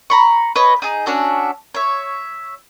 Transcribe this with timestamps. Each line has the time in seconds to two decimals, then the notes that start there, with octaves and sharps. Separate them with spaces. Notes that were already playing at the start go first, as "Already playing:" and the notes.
0.10 A#5 B5 C#6
0.56 B4 C#5 D#5
0.82 D#4 G#4
1.06 C#4 D4 F#4 E5
1.74 C#5 E5